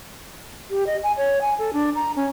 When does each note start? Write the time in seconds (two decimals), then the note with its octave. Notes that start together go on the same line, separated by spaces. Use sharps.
0.70 G4
0.87 D#5
1.03 G#5
1.17 C#5
1.41 G#5
1.59 A4
1.73 D4
1.95 A#5
2.16 C#4